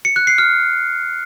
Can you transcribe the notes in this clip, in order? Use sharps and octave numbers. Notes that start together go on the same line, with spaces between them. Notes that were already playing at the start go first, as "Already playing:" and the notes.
C#7
F#6
C7
F6